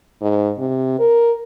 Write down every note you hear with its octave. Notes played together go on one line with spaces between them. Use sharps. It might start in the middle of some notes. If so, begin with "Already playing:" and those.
G#2
C3
A#4